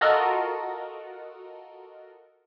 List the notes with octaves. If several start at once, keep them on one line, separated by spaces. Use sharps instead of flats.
F4 F#4 A4 A#4 D#5